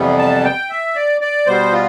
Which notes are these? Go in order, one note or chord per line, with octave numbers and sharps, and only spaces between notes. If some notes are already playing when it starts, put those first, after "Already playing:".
Already playing: F2 C3 E3 G3 B3
A5
G5
E5
D5
D5
B2 G3 B3 C5
F4